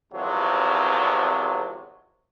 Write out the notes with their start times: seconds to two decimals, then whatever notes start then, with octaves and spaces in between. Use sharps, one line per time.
0.13 G#1 E2 C3 F3 F#3